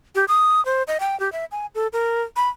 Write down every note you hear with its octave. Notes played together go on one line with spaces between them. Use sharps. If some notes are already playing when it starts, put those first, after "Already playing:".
G4
D#6
C5
D#5
G5
G4
E5
G#5
A4
A#4
B5